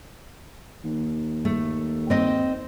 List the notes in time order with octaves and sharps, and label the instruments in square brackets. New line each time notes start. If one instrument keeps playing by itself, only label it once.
[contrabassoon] D#2
[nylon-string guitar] A3
C4 D#5